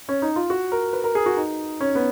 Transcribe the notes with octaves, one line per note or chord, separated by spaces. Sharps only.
C#4
D#4
F4
F#4
A#4
B4
A#4
G#4
F#4
D#4
C#4
B3